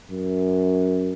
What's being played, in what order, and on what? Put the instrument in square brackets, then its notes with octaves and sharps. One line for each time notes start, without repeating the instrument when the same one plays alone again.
[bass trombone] F#2